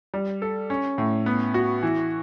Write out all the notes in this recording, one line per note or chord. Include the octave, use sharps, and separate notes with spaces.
G3
A4
C#4
A2
B3
F#4
E3